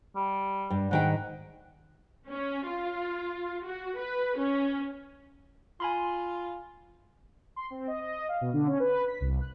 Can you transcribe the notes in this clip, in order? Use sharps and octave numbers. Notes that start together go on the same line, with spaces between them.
G3
G2
G#2 D#3 F#5 G5
C#4
F4
F#4
B4
C#4
F4 G#5 B5 C6
C6
C4
D#5
D#5
F5
B2
D3
C#4
B4
B6
C2
F#6